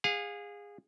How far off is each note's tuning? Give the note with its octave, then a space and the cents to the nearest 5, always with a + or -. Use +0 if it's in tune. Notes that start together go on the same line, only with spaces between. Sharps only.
G#4 -20 F5 +30